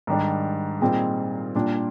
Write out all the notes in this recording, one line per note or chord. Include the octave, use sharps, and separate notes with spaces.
G#2 D#3 G3 D4
A#2 G3 C4 D#4 G#4
A#2 G3 D4